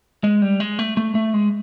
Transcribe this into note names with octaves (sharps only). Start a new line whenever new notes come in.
G#3
G3
G#3
A3
A3
A3
G#3